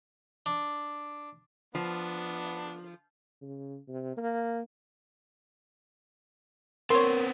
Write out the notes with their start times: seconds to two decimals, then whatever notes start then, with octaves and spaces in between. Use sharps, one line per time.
0.46 D4
1.75 F3 B3 D4
3.42 C#3
3.88 C3
4.17 A#3
6.90 B3 C4 A#4 C#5 C6